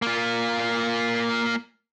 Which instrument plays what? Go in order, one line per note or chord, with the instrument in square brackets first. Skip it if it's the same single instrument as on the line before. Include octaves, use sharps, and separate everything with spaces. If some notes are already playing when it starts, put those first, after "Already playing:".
[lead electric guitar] A#3 F4